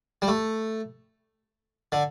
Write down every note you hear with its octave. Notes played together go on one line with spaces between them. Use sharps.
G3
A3
D3